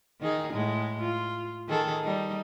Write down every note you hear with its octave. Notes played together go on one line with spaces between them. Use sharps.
D#3 D#4 G#4
A2 G#3
F4
D#3 G#4 A4
G3 D#4